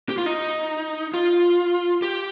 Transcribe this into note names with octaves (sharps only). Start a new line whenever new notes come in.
G4
F4
D#4
F4
G4